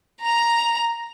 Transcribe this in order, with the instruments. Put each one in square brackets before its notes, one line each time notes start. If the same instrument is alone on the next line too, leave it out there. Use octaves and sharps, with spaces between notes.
[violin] A#5 F7